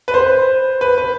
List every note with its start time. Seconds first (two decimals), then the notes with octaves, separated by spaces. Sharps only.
0.08 B4
0.14 C5
0.81 B4
0.98 B4